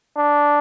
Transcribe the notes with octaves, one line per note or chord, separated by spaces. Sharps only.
D4